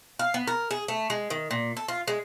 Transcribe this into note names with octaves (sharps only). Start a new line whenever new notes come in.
F5
B3
A#4
G#4
A3
G#3
D#3
A#2
A4
F4
G#3